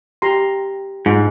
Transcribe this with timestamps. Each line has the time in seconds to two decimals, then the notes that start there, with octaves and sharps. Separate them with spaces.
0.22 G4 A#5 C6
1.06 G#2 F4 G#4